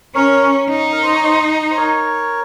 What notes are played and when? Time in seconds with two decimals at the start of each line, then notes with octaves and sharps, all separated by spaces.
0.15 C#4 A#4 C#5
0.70 D#4
0.92 A#4
1.03 C5
1.13 C#5
1.23 C5 D#5
1.70 C5
1.76 A#4 C#5